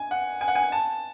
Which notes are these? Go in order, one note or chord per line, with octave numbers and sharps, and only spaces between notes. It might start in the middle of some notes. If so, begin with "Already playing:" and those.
Already playing: G#5
F#5
G#5
F#5
G#5
A5